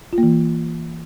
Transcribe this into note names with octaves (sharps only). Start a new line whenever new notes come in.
F4
A#3
E3